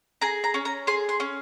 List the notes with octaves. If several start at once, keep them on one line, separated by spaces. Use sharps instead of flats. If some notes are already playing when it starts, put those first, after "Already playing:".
G#4 A#5
A#5
C#4
A#5
G#4 C6
C6
C#4